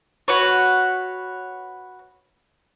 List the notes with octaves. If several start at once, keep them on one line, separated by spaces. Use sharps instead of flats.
F#4 B4 C#5